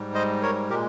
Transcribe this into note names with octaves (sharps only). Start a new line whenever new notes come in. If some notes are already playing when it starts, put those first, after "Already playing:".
Already playing: G#2 G3
C5 D#5
A#4 C#5
A#2 G#3 G4 A#4